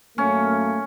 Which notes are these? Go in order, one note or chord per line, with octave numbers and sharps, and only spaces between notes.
F#2 A3 A#3 C#4